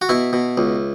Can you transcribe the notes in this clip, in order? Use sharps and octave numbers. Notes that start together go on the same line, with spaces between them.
F#4
B2 E4
B2
C#2